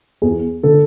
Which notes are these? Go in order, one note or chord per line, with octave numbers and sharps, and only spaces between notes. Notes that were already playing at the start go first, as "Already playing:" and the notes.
E2 G#4
D3 A4